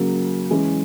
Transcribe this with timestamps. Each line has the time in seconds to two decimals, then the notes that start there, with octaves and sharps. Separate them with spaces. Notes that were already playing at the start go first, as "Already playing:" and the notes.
Already playing: C#3 F#3 A#3
0.50 E3 G#3 C#4